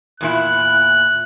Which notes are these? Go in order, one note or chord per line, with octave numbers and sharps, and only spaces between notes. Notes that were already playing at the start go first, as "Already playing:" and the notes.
E2 A#2 E4 F#6